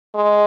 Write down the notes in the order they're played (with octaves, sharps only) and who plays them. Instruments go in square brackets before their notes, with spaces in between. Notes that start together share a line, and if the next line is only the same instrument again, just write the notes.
[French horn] G#3